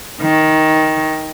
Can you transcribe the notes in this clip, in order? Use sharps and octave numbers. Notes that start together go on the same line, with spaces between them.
D#3